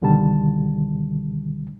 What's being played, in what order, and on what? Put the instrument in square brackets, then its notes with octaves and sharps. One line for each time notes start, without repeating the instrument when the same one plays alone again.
[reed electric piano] C#2 B2 D3 D#3 G3 A5